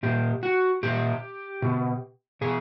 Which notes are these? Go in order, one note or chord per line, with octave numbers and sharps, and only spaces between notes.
A#2 G4
F#4
A#2 G4
B2
B2 G#4